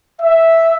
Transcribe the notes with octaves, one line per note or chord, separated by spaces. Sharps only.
E5